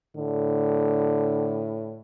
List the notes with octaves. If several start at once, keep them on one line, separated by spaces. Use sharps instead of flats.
A2 D3